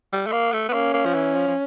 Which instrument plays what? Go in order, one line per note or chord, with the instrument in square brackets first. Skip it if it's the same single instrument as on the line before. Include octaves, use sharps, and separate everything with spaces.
[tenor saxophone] G3
A3
A#3
A3
B3
[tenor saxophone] A#3 [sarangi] C#4
[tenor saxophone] A#3
F3
E3
F3
F3